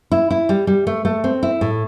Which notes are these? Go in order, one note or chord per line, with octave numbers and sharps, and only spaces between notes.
E4
E4
G3
G3
A3
A3
C4
E4
A2